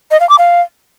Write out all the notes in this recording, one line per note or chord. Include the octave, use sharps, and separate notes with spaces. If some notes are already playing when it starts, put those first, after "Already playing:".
D#5
F5
D6
F5